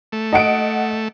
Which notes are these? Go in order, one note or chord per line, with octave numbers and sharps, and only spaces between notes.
A3
D#5 F#5 D7